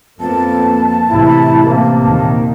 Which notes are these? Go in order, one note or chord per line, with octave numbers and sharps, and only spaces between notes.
F2 A#3 B3 A5
A1 C3 E4
C3 A#3
D#2 A#2 D#3